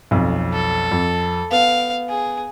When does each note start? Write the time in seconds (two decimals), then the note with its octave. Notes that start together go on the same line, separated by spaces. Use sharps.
0.11 B1 F2
0.53 A4
0.91 F2
1.51 B3 F5
2.09 G#4